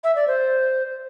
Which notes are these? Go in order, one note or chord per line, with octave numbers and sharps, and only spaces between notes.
E5
D5
C5